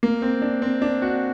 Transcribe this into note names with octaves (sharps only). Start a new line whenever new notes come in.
A#3
C4
D4
C4
D4
F#4